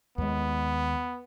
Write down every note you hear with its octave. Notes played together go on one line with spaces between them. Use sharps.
D#2 G#3 B3